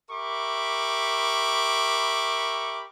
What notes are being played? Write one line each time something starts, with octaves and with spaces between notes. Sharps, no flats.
G4 A#4 E5 B5 C#6 D6